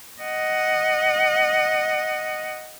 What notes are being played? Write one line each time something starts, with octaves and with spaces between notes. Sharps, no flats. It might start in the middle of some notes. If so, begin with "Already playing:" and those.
D#5 F#5